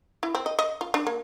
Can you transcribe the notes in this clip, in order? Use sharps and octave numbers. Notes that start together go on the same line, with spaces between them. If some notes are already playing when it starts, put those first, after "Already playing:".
E4
C4
D#5
D#5
F4
D4
A#3